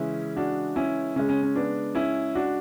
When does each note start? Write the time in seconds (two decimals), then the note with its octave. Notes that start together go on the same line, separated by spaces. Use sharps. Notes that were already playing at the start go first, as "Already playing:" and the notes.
Already playing: C#3 E3 G#3 C#4 E4
0.37 D4 F#4
0.76 C#4 E4
1.16 C#3 G#3 C#4
1.29 C#4
1.43 C#4
1.56 B3 D4
1.95 C#4 E4
2.35 D4 F#4